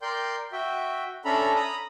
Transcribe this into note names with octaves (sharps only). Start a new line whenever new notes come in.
A#4 D5 G5 C6 G6
F#4 E5 G5
C#4 D4 A4 E5 A#5 B5
A#5 B5 D#6